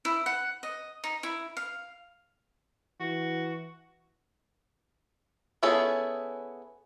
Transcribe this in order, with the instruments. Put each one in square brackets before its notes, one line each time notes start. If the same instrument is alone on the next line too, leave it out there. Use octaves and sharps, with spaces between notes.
[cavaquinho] E4
F#5
D#5
D#4
E4
F5
[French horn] E3 [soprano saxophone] F#4
[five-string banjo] B3 C#4 E4 G#4 A4